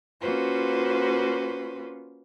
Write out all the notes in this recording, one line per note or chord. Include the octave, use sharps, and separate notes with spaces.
A#3 C#4 F4 F#4 B4 C5